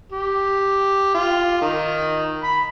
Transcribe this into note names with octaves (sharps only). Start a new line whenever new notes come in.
G4
F4
D#3
B5